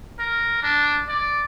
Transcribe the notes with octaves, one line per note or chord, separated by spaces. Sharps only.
A#4
D4
D5